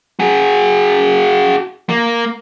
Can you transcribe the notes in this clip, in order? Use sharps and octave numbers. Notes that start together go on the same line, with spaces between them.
F#4 G#4
A#3